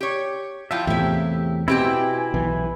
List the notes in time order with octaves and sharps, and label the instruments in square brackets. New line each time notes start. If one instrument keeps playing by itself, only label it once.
[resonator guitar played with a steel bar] G4 C#5
[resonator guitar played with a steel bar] F3 E4 F4 [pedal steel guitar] E5 G5
[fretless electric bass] E2 A2 C3 [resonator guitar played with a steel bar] E4 G4
[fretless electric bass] B2 [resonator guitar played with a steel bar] C4 G4 G5 [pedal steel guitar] E4 G#5
[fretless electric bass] B1 E3